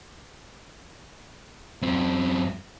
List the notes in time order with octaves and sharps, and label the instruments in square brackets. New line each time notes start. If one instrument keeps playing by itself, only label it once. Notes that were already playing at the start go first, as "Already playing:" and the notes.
[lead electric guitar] F#2 C4